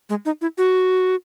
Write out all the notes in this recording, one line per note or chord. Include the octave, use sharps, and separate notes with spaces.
G#3
D#4
E4
F#4